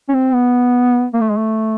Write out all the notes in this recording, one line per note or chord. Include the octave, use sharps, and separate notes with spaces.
C#4
C4
B3
A#3
A3
G#3
A3